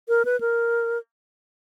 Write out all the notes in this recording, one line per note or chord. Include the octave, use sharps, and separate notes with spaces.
A#4
B4
A#4